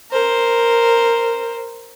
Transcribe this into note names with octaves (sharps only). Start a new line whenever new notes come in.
A#4 C5